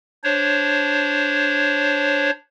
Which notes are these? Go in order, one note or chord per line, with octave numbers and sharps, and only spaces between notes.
D4 C5 C#5